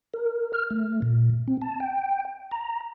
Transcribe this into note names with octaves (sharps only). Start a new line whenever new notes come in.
A#4
F6
A3
A#2
C4
A5
G5
A#5